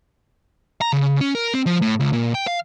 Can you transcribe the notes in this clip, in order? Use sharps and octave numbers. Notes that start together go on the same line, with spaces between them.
A#5
C#3
C#4
A#4
C4
F3
A2
C#2
A#2
G5
F5